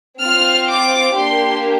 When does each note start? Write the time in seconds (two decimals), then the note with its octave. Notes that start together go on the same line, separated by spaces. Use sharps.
0.20 C4 F4 F6
0.68 D6
1.15 A#3 D4 G4 C6